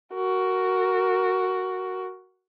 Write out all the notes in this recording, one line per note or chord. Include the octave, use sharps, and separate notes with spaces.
F#4 A#4